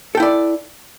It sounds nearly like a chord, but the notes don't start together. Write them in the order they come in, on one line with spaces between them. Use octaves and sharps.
A4 G5 E4 D5